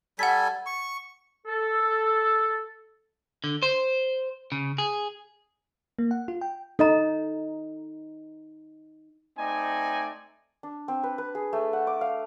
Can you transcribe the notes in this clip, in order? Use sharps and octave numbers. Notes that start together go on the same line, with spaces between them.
G3 A4 F#5 G#5 B6
C#6
A4
D3
C5
C#3
G#4
A#3
F#5
F4
G5
D#4 A4 D#5 A#5
A3 C4 D#4 D5 G#5
D4
C4
B4
B4
G#4
A3
F#5
D6
F5